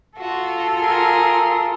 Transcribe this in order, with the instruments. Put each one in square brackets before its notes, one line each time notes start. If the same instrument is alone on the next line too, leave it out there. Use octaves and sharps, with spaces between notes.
[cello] F4 A4 [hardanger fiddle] F#4
[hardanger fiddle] G#4 A#4